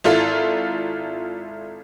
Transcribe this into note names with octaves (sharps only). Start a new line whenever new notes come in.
G#1 E4 F4 A4